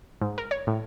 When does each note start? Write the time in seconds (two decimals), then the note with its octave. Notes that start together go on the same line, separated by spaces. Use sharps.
0.21 G#2
0.38 A#4
0.51 C#5
0.67 A2